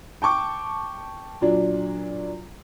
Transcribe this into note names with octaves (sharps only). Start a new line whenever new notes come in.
G5 A5 C#6 D6
A#2 F#3 D4